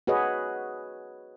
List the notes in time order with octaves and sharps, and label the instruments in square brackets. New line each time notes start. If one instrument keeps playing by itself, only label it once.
[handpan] F#4 G#4 B4 C#5 D#5